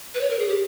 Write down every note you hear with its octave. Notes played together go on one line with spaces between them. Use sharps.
B4
C#5
A#4
G#4
G4